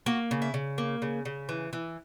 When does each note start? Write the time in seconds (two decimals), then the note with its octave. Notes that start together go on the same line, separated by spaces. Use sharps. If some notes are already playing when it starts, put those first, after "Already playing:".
0.06 A#3 F#4
0.31 C#3
0.42 E4
0.54 C#3
0.78 A#3
1.02 C#3
1.25 C#3
1.49 E3
1.73 E3